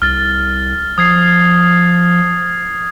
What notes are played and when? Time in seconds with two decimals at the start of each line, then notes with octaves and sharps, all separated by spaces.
0.02 C2 F6 A6
0.98 F3 D#6 G#6 C7